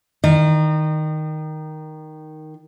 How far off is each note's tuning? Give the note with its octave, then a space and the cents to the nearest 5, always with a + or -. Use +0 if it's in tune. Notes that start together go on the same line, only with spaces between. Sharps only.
D#3 +0 D#5 -35